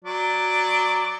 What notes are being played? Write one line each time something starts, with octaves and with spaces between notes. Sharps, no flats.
F#3 D5